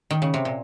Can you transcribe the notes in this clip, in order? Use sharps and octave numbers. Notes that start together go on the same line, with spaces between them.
D#3
C#3
C3
A#2